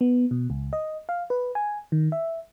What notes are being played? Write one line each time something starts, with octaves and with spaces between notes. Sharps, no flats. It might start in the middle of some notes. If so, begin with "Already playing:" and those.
B3
B2
C#2
D#5
F5
B4
G#5
D#3
E5